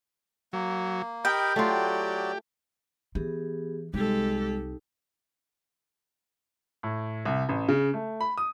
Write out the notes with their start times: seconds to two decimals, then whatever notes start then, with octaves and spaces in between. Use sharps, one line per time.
0.53 F#3 A#3
1.25 G4 A#4 D#5 G5 B5
1.56 F#3 A3 F4 F#4 D5
3.15 E3 B3 G4 G#4
3.94 C2 G#3 D#4 G4 A4
6.83 A2
7.25 C2
7.49 A1
7.68 C#3
7.94 A3
8.21 B5
8.38 D#6